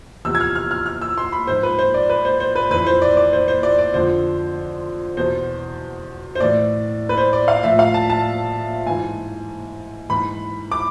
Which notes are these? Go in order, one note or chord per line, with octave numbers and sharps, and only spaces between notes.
E2 C3 F3 E6
G#6
F6
F6
F6
F6
E6
C6
B5
G#2 F3 C5
B4
C5
D5
B4
C5
C5
B4
F2 E3 B4
C5
D5
D5
C5
C5
D5
D5
F2 D3 F3 C5
E2 B2 C5
C5
A2 E3 D5
B4
C5
D5
F5
A2 F3 E5
F5
A5
A5
G#2 E3 G#5
G#2 E3 B5
D6